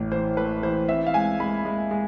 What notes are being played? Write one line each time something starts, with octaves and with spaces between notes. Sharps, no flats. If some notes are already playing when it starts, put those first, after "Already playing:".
Already playing: A1 A2 E3
E3 C5
A3 B4
E3 C5
C4 E5
F5
G#3 G#5
G#3 B5
G#3
G#3